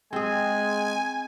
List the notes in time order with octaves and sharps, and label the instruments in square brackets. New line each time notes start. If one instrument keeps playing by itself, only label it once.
[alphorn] G#3 [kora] C4 G#4 [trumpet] G#5